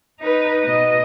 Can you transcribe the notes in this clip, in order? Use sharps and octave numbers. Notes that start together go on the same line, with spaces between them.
D#4 B4
B2 D#5